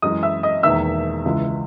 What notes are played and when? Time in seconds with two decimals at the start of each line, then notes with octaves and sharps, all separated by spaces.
0.02 F#2 E3 G#3 D#5 D#6
0.23 E5 E6
0.43 D#5 D#6
0.63 E1 E2 D#3 A#3 E5 E6
1.25 C#2 C#3 E3 G#3